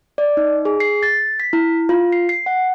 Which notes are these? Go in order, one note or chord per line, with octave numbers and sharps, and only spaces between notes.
D5
D#4
G#4
C7
A6
B6
E4
F4
C7
C7
F#5